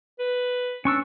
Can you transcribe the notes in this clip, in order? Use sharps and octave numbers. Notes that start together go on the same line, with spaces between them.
B4
C#4 D4 C#6 E6